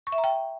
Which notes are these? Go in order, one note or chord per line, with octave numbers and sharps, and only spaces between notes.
C#6
E5
A#5
G5